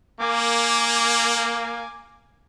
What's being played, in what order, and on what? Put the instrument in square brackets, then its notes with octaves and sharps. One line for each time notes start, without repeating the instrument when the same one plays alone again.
[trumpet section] A#3 [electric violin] G#5 D6